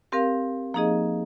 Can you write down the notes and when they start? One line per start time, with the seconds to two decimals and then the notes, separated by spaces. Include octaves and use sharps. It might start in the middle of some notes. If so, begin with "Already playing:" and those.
0.12 C4 G4 A#4 F5
0.74 F3 A#3 D#4 G#4 D#5